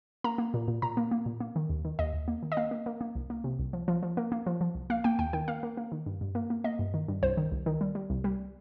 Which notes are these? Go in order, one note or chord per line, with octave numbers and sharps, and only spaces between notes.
A#3 A#5
A#3
A#2
A#2
A#2 A#5
A#3
A#3
A#2
A#3
D#3
D#2
D#3
D#2 D#5
D#2
A#3
D#3
D#5
A#3 F5
A#3
A#3
A#3
C2
A#3
C3
C2
F3
F3
F3
A#3
A#3
F3
F3
C2
A#3 F5
A#3 G5
D#2 G5
D#3 G5
A#3 F5
A#3
A#3
D#3
G2
G2
A#3
A#3
A#3 D#5
G2
D#3
G2
C2 C5
D#3
C2
D#3
G3
G3
C2
G3